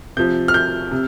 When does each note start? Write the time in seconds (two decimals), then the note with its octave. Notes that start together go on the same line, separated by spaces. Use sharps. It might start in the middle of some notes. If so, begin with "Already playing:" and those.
0.17 C3 F3 G6
0.48 F6
0.54 G6
0.91 C3